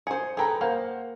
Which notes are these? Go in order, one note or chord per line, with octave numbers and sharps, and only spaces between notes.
G#4 C5 C#7
G#4 A4 B4 G5 A#5
A#3 C5 F5 F#5